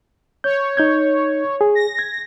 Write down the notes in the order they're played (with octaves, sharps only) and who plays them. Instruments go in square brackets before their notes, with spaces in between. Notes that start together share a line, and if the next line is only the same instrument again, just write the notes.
[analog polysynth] C#5 [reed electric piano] G6
[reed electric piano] D#4 G6 G#6
G#4
[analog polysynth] A#6
[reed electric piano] G#6